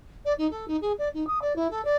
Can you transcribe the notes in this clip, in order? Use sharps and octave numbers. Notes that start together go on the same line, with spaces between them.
D5
D#4
A4
D#4
G#4
D5
D#4
D#6
D5
E4
A4
D5